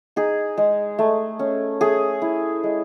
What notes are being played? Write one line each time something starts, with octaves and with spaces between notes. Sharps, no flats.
D#4 G#4
G#3
A3
C#4
A3 G#4
E4
G#3